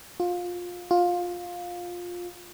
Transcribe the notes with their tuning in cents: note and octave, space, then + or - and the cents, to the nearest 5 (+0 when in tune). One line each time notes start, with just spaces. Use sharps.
F4 +20
F4 +15